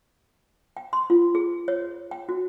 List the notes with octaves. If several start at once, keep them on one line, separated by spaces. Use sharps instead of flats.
G5
C6
F4
G#4
C#5
G5
F#4